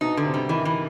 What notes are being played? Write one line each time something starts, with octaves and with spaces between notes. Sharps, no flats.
B2 D#4
D3
C3
G3
D#3 E3
E3